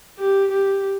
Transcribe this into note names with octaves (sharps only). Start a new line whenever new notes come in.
G4
G4